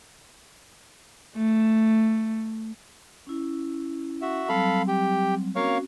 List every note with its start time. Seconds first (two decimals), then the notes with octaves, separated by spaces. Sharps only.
1.37 A3
3.27 C#4 E4
4.22 F#4 E5
4.49 F#3 G3 C4 A4 F5 B5
4.88 G4
5.56 A#3 C4 C#4 F#4 C#5 F5